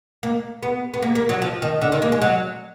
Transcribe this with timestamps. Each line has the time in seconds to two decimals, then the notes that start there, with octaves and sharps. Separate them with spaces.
0.23 A#3
0.63 B3
0.94 B3
1.02 A#3
1.15 A#3
1.29 F#3
1.42 F3
1.62 D#3
1.82 D3
1.92 D#3
2.02 A#3
2.12 G#3
2.22 F#3